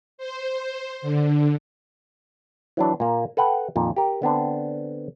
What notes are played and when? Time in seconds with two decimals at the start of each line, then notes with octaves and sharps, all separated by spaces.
0.18 C5
1.02 D3
2.77 E3 F#3 D4
3.00 A#2 A#3
3.37 A4 B4 F#5 G5
3.76 F2 A#2 D#3
3.96 G4 A#4
4.22 D3 B3 C4 D4